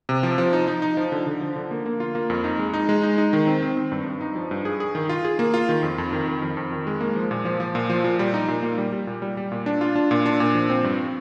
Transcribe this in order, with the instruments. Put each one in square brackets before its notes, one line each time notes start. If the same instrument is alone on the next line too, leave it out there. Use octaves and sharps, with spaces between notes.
[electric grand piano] C3
F3
F3
D#4
D#4
D#4
F3
D3
D3
F3
D3
A#3
A#3
F4
A#3
F2
D#4
G#3
D#4
G#3
D#4
D#4
D#3
C4
C4
C4
G2
G2
D#4
F3
G2
G#4
G#4
D#3
F4
G#4
A#3
F4
D#3
F2
F2
D#3
D#3
F2
F2
D#3
G#3
A#3
F3
A#2
F3
F3
A#2
F3
A#2
G3
D#4
A#2
A#3
G3
G3
A#2
G3
G3
A#2
D4
F4
D4
A#2
D4
A#2
F3
C4
G2